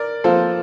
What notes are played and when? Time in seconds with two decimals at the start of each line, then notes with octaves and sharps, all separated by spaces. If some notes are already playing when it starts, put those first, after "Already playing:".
Already playing: A#4 D5
0.24 F3 A#3 F4 A4 C5